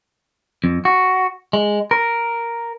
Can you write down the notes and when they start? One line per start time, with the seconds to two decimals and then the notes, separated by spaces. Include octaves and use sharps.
0.64 F2
0.85 F#4
1.53 G#3
1.91 A#4